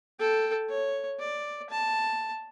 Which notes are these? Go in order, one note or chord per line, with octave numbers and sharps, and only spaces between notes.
A4 G5
C#5
D5
A5